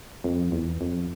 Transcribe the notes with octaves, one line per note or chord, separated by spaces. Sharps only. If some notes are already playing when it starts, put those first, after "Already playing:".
F2
E2
F2